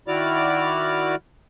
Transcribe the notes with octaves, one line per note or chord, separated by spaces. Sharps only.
D#3 E4 F#4 D5 D6 F6